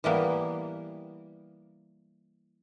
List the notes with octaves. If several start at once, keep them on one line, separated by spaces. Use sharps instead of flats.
E3 G3 A#3 B3